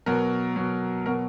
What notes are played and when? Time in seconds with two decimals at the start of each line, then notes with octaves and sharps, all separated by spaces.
0.06 B2 F#3 A#4
0.56 B2 F#3
1.06 B2 F#3 A#4